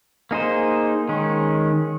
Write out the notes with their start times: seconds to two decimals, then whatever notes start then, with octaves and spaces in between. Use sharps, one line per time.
0.31 A#3 D#4 G#4 C5
1.09 D#3 G#3 C#4